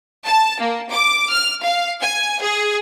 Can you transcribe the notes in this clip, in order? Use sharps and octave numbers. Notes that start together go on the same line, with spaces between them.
A5
A#3
D6
F6
F5
G#5
G#4